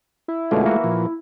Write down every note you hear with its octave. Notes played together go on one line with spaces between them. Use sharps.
E4
F#2 B2 D3 G#3 A3 F4
E3 A#3 F#4
A#2 F3